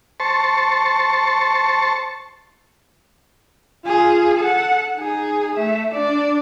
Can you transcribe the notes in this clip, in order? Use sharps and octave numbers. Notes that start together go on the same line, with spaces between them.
C5 A5 C#6
F4 G#4
A4 F#5
D#4 G#4
A3 E5
D4 D5